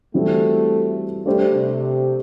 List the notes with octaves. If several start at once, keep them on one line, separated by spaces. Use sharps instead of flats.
E3 G3 A3 C4 F#4
G3 A3 D4 G4 C5
C3